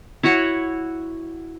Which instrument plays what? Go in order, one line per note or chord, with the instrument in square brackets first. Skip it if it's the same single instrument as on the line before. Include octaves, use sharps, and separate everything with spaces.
[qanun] E4 F#4 C#5 F#5